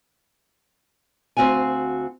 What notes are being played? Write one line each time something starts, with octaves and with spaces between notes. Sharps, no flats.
D2 C4 F#4 F5 G#5